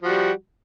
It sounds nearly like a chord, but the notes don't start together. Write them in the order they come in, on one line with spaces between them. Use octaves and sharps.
F3 F#4 G3